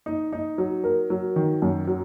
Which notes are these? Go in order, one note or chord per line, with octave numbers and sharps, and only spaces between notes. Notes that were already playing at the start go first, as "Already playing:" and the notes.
D#4
D#4
F#3
A#4
F#3
D#3
F#2
F#3